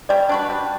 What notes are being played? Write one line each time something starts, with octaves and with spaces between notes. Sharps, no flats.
G3 D5
D4 F#4 B4
G3